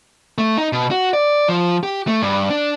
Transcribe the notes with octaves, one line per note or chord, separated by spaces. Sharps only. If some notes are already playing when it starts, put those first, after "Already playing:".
A3
D#4
B2
F#4
D5
F3
G4
A3
G2
D4